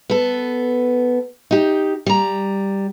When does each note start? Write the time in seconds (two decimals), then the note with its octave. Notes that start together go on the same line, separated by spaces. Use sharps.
0.10 B3 A4
1.51 D#4 G4
2.06 G3 A#5